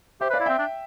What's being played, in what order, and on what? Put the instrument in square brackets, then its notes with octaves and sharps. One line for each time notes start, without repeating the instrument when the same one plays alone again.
[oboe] G4 [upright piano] C5 E5
[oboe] B4
[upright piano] D5 F5
[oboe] E4
[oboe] C4 [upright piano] E5 G5
[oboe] D4